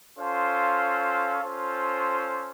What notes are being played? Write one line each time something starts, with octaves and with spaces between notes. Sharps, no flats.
C#4 F4 A4 C5 F5
C#4 F4 A4 C5